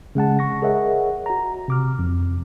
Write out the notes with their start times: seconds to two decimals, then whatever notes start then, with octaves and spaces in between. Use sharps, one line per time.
0.15 C#3 G#3 F#5 A5
0.39 C#6 A#6
0.62 G#4 A#4 C#5 D#5 E5 F#5
1.26 F#4 A#5
1.68 C3 D6 F6
1.99 F2